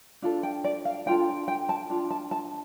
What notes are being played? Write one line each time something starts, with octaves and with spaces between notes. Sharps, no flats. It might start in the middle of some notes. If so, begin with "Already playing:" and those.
D4 F4 A4
G5
D5
F5
D4 F4 A4 G5
G5
A5
D4 F4
A5
A5